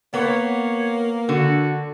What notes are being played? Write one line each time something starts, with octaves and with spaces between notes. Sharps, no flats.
A#3 B3 C#5
D3 F#4